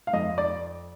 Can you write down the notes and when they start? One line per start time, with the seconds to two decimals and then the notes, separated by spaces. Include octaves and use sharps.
0.07 F5
0.13 F2 D#5
0.38 D5